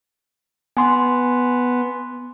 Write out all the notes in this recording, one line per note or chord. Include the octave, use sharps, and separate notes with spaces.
B3 G#5 C6